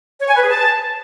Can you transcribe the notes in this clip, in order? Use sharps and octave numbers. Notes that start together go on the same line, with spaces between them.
C#5
G#5
B4
G#4
A5